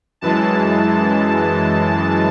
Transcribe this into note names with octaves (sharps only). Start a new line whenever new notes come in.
F#2 E3 G#3 A5